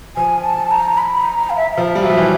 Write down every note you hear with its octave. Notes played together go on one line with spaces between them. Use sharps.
F3 G#5
A5
A#5
B5
A#5
A#5
F5
E5
E5
F3 F5
G3
F#3 E5
F3
E3